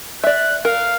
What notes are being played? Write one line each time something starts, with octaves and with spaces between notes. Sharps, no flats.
D5 E5 F#6
A#4 F5